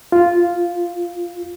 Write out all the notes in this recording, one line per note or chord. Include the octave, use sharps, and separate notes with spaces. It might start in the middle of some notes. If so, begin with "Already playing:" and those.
F4